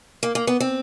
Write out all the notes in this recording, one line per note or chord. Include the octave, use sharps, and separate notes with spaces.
A#3
A#3
B3
C4